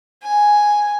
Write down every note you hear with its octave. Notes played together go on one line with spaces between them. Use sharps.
G#5